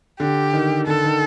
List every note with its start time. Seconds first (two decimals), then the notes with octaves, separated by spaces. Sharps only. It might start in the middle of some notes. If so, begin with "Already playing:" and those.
0.20 D3 G4
0.53 D#3
0.87 D3 A4
1.04 D#3